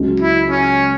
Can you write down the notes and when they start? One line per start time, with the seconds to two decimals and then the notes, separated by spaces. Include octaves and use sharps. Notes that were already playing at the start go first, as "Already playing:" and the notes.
Already playing: C#2 C#3 F#3
0.20 E4
0.50 C#4